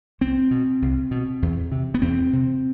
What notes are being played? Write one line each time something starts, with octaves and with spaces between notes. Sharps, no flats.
C2 C4
B2
C2
B2
E2
C3
B3
E2 C4
C3